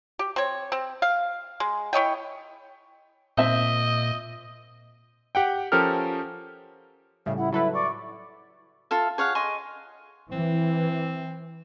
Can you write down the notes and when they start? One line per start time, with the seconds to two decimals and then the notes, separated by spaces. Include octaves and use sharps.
0.19 G4
0.36 C4 C#5
0.72 C4
1.02 F5
1.60 G#3
1.93 E4 C#5 D#5 G5
3.38 A#2 C4 D#5 E5
5.35 G4 F#5 G5
5.72 F3 C#4 G4 A4 A#4 F6
7.26 A2 C#3 G3 E5
7.37 E4 F#5
7.52 F#3 E4 A4 B4 E5
7.74 D5 C#6
8.91 F4 A4 E5
9.18 G#4 C#5 F5 F#5
9.35 D#5 G#5 C6 C#6
10.32 E3 C4